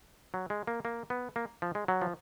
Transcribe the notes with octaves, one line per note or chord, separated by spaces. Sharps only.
F#3
G#3
A#3
A#3
B3
A#3
F3
G#3
F#3
F3